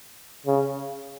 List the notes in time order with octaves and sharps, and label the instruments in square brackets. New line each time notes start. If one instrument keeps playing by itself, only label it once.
[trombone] C#3